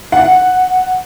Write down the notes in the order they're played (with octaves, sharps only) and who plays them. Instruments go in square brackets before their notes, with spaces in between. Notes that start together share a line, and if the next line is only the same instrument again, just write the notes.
[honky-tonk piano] F#5